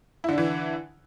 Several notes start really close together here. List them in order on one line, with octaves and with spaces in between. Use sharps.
E4 D3 D4 E3